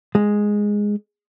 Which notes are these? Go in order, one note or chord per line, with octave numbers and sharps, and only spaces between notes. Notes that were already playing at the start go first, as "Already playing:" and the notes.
G#3